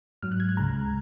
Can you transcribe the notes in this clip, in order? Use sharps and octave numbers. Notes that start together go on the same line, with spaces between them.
G#2 F#3 F6
F#6
G#6
F#6
C#2 C#3 G#3 A#5